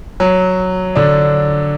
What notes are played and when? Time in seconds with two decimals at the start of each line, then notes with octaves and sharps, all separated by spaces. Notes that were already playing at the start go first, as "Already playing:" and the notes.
0.20 F#3
0.95 D3 D4